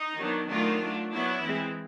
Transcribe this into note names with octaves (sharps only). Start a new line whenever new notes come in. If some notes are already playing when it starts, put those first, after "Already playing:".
Already playing: D#4
D#3 F#3 B3 D4
D#3 F#3 A3 D4 F4
F#3 A3 D4
F#3 B3 D4 E4
E3 G#3 C4